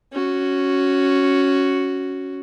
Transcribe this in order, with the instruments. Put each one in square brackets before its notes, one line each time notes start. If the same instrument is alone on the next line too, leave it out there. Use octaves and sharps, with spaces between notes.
[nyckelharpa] C#4 F#4